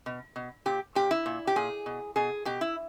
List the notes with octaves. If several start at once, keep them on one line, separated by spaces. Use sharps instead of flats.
B2
B2
A#2 G4
A#2 G4
E4
A#2
G4
A#2 G#4
B2
B2 G#4
B2 G4
E4